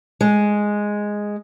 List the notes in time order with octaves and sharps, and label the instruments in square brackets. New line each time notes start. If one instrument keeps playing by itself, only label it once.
[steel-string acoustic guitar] G#3